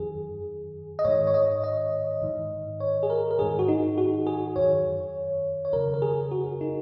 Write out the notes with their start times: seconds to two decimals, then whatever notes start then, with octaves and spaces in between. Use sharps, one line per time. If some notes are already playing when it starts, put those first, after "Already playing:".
Already playing: F#2 D#3 G#4
0.99 D#5
1.05 G#2 D#3 C#5
1.27 C#5
1.34 D#5
1.64 D#5
2.22 G#2 D#3
2.80 C#5
3.03 G#4
3.10 A#4
3.31 A#4
3.39 G#2 D#3 G#4
3.59 F#4
3.68 D#4
3.98 F#4
4.27 G#4
4.56 F#2 D#3 C#5
5.65 C#5
5.73 F#2 C#3 A#4
5.94 A#4
6.02 G#4
6.31 F#4
6.61 D#4